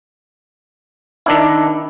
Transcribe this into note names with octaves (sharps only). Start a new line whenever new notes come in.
D#3 D4 E4